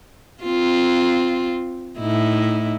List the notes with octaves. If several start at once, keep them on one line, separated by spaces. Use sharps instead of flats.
C4 F4
A2 D#4 E4